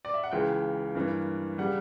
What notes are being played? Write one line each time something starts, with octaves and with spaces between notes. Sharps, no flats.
D5
E5
F#5
C#2 C#3 E3 G5
G2 E3 A#3
C#3 G3 F#5